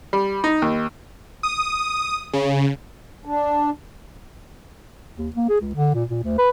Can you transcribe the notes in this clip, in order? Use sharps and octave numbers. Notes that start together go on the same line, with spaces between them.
G3
D#4
D#2
D#6
C#3
D4
D#2
A#3
G#4
C#2
D3
A#2
A#2
D2
B4